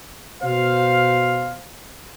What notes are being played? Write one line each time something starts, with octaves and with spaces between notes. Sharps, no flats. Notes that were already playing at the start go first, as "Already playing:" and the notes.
B2 C5 F5